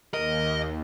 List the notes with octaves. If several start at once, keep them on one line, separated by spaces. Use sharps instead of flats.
D#2 A#4 D#5